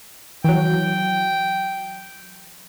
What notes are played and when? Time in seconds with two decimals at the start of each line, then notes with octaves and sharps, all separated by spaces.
0.44 E3 F#3 G5